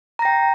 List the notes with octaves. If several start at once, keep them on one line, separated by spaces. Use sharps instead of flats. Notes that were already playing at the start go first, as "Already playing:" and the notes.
G5 A#5 A#6